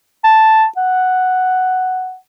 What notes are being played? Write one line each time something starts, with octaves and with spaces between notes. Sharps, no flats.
A5
F#5